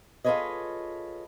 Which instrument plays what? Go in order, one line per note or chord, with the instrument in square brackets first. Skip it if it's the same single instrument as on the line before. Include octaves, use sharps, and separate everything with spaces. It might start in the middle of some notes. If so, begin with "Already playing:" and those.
[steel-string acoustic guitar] F4 G#4 A4 B4 C#5 D#5